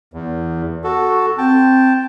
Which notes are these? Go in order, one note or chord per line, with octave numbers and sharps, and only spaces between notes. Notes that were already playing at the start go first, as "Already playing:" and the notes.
E2
F#4 A4
C4 G5 A5